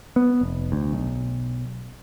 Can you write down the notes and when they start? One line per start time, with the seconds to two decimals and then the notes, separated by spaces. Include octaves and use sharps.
0.16 B3
0.41 F1
0.72 D2
0.93 B1